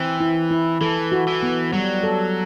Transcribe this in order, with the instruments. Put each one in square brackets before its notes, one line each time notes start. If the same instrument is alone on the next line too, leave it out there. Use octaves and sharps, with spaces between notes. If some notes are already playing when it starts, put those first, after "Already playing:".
Already playing: [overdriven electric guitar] E3 [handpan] C4
[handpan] E4
E4
[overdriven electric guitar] E3 [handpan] A4
[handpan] F#4
[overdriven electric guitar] E3
[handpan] B3
[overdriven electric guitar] F#3 [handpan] G3
[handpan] A4